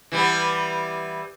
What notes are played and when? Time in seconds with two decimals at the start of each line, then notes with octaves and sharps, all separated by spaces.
0.12 E3 G3 B3